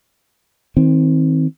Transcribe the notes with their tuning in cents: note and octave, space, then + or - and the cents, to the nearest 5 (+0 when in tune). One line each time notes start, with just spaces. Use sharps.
D#3 +35 C4 +5